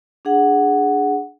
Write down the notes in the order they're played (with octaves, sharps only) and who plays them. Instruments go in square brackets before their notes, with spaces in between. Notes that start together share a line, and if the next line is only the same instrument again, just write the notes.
[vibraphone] D4 G#4 F#5